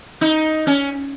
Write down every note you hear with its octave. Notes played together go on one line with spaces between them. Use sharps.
D#4
C#4